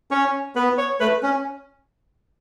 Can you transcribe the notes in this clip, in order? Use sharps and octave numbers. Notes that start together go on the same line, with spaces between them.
C#4 C#5
B3 B4
C#5
A3 B4
C#4